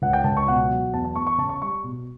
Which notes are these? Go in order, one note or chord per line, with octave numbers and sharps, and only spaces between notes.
C#2 F#5
G5
C#2 A5
C#6
B2 F#5
F#3
E2 A5
A5
E2 C#6
C#6
C#3 A5
C#6
G3 C#6
B2